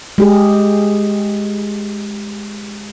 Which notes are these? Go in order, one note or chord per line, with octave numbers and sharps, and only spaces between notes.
G#3 G4 G#4